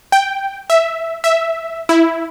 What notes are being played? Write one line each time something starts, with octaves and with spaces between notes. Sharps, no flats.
G5
E5
E5
E4